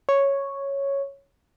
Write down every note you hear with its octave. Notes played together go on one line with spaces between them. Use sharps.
C#5